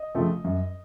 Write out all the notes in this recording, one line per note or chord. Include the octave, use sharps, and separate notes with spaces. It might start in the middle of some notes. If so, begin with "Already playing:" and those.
Already playing: D#5
C#3 F3 A3 C4
F#2